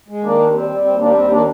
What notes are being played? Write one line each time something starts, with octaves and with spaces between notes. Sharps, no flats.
G#3
D#3 A#3 D4
D#2
G3 C4
G3
D#2 C4
G3 A#3 D4
D4
D#2 C4
D#3 A#3 D4